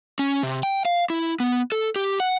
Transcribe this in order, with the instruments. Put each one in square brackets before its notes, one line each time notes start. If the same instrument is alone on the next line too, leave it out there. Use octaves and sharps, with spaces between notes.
[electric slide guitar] C#4
C3
G5
F5
E4
B3
A4
G4
F#5